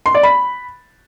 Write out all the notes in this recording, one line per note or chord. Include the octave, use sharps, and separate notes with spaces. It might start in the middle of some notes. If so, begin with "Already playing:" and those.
C6
D5
B5